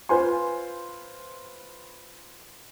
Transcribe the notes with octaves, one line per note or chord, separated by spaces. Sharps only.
F4 B4 C5 G#5 C6